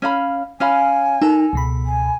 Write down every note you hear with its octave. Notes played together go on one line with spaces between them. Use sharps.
C#4 F5 B5
C#4 F5 G#5 B5
D#4 A4 A#4
C#2 B2 B5
G#5